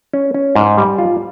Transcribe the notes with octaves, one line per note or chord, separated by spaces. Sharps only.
C#4
C#4
G#2
G3
F4